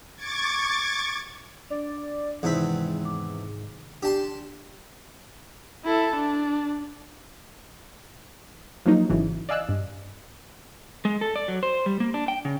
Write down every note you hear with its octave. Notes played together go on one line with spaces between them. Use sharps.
C#6 D6 G#6 A6
D4 D5
E2 G#2 C3 D#3 C4 D#4 B5
D6
D4 G4 A5 C6
E4 A4
D4
F3 F#3 A#3 D#4
G#1 C#3 E3 F#3
D5 D#5 F5 G#5 E6 F#6
G2
G#3
A4
D5
F#3
C5
G3
A#3
D4
G5
C#3